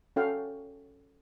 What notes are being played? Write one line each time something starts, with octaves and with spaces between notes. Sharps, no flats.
C#4 F#4 A4 F5 G5